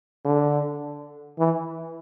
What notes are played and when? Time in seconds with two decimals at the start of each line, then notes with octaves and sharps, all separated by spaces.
0.25 D3
1.39 E3